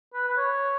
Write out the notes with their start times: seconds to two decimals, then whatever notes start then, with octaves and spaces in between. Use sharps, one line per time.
0.14 B4
0.28 B4
0.37 C#5